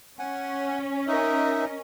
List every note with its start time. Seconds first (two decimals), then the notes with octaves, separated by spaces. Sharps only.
0.19 C#4 F#5 G#5
1.08 D#4 A#4 D#5 E5